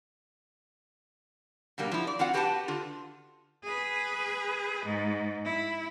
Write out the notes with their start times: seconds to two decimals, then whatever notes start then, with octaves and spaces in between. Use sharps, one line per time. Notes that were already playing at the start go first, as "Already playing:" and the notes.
1.78 B2 D3 G3 A#3
1.92 F3 E4
2.07 D5
2.19 C4 F4 F#4 F#5
2.34 F#4 G4 B4 C5 F#5 A5
2.68 D3 F4
3.64 G#4 B4
4.85 G#2
5.45 E4